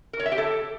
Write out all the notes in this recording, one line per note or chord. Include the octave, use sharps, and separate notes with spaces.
A#4
C#5
E5
G4
A4